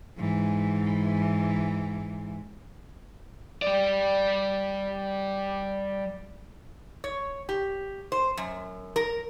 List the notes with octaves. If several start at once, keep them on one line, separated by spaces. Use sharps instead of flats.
G#2 E3
G3 D5
C#5
G4
C5
F#2
A#4